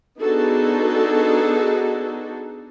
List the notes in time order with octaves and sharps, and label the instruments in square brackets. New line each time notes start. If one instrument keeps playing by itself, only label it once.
[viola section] B3 D4 D#4 F#4 G#4 A4